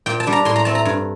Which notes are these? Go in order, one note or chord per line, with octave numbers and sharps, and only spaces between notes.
A#2 G5
A5
G3 D4
A#5
A2 C6
A#5
A3 C4 A5
A#5
G2